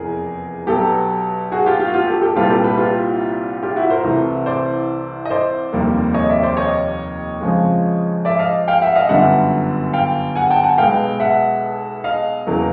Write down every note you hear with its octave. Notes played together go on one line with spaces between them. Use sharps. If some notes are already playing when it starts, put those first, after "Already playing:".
Already playing: F1 E2 G#4 A#4
B1 B2 F#3 G4 A4
F#4 G#4
F4 G4
F4
F#4
F4 G4
G4 A4
G4 A4
C2 A#2 G3 B3 F4 G4
G4 A4
A4 B4
F4 G4
F4 G4
E4 F#4
A#4 C5
C2 C3 E3 A3
C5 D5
D#5
C5 D5
F1 D#2 D#3 G3 A#3
C#5 D#5
D5 E5
C5 D5
C#5 D#5
F2 C#3 F3 G#3
D5 E5
D#5 F5
F5 G5
E5 F#5
D#5 F5
G1 F#2 D3 G3 E5 F#5
F5 G5
F#5 G#5
G5 A5
F#5 G#5
B1 B2 G#3 B3 F5 G5
E5 F#5
D#5 F5
E2 C#3 F#3 A#3